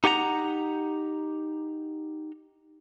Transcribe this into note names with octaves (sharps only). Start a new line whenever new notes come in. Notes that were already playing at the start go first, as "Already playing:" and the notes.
D#4 G4 F#5 G#5 A#5